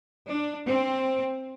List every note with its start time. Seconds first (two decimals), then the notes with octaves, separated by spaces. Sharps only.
0.28 D4
0.67 C4